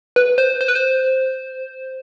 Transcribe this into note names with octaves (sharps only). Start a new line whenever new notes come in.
B4
C5
C5
B4
C5